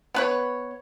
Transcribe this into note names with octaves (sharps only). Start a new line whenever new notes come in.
B3 B4 C#5